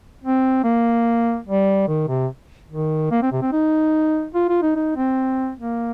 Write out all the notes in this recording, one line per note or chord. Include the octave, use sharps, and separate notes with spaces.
C4
A#3
G3
D#3
C3
D#3
A#3
C4
C3
C4
D#4
F4
F4
D#4
D#4
C4
A#3